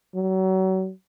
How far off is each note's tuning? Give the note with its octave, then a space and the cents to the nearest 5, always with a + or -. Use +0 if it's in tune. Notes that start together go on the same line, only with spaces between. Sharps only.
F#3 +35